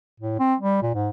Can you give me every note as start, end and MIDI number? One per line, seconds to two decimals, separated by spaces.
0.20 0.38 45
0.39 0.55 60
0.60 0.81 55
0.82 0.94 46
0.94 1.10 44